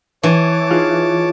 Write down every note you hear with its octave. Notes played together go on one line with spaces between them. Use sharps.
E3 C#5 A5 D6
D#4 F4 G#4